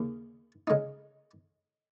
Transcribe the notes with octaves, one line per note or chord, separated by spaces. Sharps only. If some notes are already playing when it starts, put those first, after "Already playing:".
Already playing: D#2 C#3
C#3 G#3 D#4